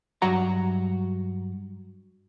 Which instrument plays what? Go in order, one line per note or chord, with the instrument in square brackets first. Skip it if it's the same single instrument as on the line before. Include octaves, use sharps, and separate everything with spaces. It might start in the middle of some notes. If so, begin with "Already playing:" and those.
[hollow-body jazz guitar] G2 F#3 F#4 F#5 A#5